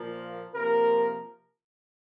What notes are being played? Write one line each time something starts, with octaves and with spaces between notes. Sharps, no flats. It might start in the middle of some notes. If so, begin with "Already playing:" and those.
Already playing: A#2 F3 A#3
C3 F3 A#3 A#4